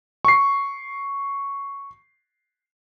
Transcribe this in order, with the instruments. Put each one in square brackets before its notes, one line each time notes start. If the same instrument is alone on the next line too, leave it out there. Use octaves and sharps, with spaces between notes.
[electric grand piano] C#6 C7